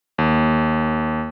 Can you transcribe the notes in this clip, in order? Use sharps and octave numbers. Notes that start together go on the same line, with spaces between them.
D#2